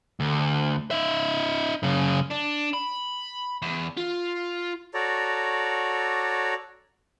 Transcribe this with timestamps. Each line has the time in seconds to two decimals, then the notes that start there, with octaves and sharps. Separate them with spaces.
0.20 D2
0.91 D#4 E5
1.83 F#2 C#3
2.31 D4
2.74 B5
3.62 E2
3.97 F4
4.94 F#4 A4 C#5 D5 A#5